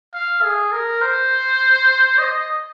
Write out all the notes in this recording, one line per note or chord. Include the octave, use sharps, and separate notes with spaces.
F5
G#4
A#4
C5
D#5